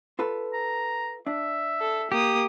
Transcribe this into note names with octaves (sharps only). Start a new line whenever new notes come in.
F4 A4 B4
A#5
D4 E5
A4
A#3 G4 D#6